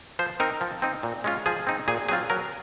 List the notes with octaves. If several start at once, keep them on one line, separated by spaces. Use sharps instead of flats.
F3 C5
C4 D#4 A#4
F3
C4 D#4
A#2
G#3 C#4 F4
F3 G#4
C4 D#4
A#2 G#4
F#3 C4 F4 G#4
F#3 A#4